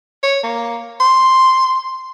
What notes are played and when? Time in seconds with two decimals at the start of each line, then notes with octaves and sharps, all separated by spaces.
0.23 C#5
0.44 A#3
1.00 C6